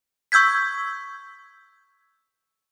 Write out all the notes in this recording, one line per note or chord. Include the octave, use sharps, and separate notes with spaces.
C#6 E6 G6 G#6 B6